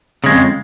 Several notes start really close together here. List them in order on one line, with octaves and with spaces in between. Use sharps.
C#3 G#3 F2